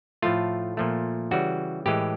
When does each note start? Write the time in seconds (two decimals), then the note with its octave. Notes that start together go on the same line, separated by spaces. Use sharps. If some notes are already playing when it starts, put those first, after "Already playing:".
0.22 A2 F3 A3 F4
0.77 A#2 F3 A3
1.31 C#3 E3 G3 F#4
1.86 A2 E3 G#3 G4